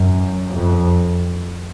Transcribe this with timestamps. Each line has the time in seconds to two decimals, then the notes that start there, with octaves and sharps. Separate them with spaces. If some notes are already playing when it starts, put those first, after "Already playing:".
Already playing: F#2
0.55 F2